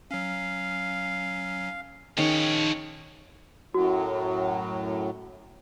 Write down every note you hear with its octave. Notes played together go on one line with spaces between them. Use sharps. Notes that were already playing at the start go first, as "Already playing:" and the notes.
F#3 C#4 F5
D#3 F3 C#4 G#4 C#5 G5
F#2 A2 F#3 F#4